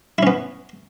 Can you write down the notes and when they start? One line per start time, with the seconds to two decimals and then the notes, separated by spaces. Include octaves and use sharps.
0.18 E4
0.23 C#4
0.27 B3